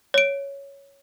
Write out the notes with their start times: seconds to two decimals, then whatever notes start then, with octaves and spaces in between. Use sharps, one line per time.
0.14 C#5 D7